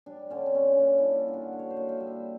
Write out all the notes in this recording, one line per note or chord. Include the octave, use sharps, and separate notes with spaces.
G3 D4
D3 C#4
C4
D3 C#4
C#4
A#3 D4
E4
G3
F4
D3
F#4
D3
C#5
C5
A#3
E5
G3
E5